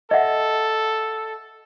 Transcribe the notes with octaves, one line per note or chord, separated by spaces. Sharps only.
A4 D#5 E5 F#5